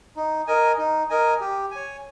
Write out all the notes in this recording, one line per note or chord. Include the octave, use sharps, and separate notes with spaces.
D#4
A#4 D#5 G#5
D#4
A#4 D#5 G#5
G4
C#5 G#5